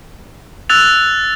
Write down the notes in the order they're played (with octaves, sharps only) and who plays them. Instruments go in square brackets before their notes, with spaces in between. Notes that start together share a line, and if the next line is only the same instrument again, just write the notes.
[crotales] E6 F#6 A6 F7